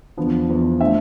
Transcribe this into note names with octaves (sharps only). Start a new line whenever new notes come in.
E2 D3 F3 B3
E2 D3 F3 B3
D3 A3 C4 E5